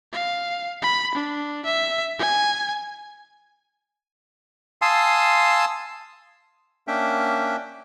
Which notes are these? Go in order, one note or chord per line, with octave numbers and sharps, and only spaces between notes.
F5
B5
D4
E5
G#5
F5 G#5 A5 C6 D#6 E6
A#3 C#4 D4 E5 G5